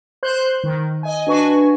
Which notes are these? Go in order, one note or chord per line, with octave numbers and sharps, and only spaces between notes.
C5 C6 F#6 G6
D#3
D#5 G#5
D4 F#4 B4 G#5 C#6